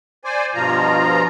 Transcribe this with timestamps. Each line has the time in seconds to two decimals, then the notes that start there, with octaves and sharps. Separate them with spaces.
0.25 C5 D5 G#5
0.55 G2 B2 F3 F4 A#5